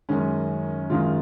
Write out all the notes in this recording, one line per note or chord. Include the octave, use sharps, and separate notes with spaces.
F#2 D#3 G#3 C#4
F#2 D#3 G#3 F4